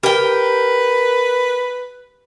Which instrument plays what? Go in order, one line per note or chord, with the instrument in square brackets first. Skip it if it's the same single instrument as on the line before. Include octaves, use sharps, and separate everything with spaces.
[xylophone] G4 [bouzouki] A#4 G5 [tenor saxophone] B4